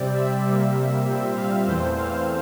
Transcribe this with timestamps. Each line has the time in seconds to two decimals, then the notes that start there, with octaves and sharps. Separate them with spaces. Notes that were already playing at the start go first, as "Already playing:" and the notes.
Already playing: C3 G3 C4 D5
0.14 E5
0.45 C3 G3 A#3
1.06 A#2 G3 C4
1.36 F5
1.65 E2 E3 A3 C4 C5
1.96 F5